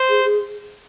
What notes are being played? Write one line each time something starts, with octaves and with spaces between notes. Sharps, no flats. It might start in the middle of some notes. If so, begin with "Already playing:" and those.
Already playing: C5
G#4
G#4